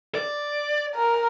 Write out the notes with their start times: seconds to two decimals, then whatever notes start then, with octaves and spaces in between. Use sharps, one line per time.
0.15 D5
0.95 A#4